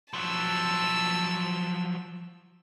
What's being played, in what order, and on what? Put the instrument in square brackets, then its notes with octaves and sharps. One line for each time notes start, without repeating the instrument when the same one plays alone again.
[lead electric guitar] F3 F#3 [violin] A5 E6